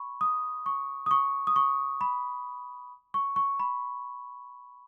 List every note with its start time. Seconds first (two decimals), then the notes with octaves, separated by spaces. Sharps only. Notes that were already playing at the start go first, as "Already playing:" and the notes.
Already playing: B5 C#6
0.21 D#6
0.66 C#6
1.06 D#6
1.11 C#6
1.47 D#6
1.56 C#6
2.01 B5
3.14 C#6
3.36 C#6
3.60 B5